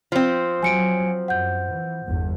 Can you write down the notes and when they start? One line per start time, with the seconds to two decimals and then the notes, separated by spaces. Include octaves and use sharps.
0.12 F3 C4
0.63 F#3 G#5 C#7 D7
1.28 F#2 F#5 G6
1.70 E3
2.06 G1 E2 G2